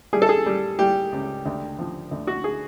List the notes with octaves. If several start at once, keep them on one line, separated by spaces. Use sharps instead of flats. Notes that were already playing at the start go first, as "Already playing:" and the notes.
G3 G#4
A4
G#4
G3
G3 G4
C#2
D2
F3
D2
F#4
G#4